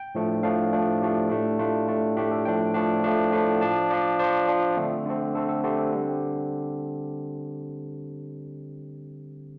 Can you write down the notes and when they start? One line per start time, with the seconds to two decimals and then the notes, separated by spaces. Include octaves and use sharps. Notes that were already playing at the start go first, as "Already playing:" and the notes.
Already playing: G5
0.15 A2 F3 A3 D4
0.43 A2 F3 A3 D4 F5
0.73 A2 F3 A3 D4
1.01 A2 F3 A3 D4 G4
1.30 A2 A3 D4
1.59 A2 A3 D4 F4
1.88 A2 A3 D4
2.17 A2 A3 D4 G4
2.31 A4
2.45 A2 F3 A3 D4 G5
2.74 A2 F3 A3 D4
3.04 A2 F3 A3 D4
3.33 A2 F3 A3 D4
3.61 F3 D4 A5
3.90 F3 D4 D5
4.19 F3 D4 C5
4.48 F3 D4
4.77 D3 A3 C4
5.06 D3 A3 C4
5.35 D3 A3 C4 A4
5.49 A4
5.64 D3 A3 C4 G4
5.92 D3 G3 C4